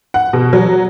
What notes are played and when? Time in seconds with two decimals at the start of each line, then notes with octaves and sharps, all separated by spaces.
0.14 F#5
0.33 B2
0.53 F#3